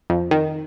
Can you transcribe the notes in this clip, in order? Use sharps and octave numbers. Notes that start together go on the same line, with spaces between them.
F2
D#3